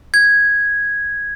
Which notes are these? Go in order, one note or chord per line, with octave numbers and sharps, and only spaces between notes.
G#6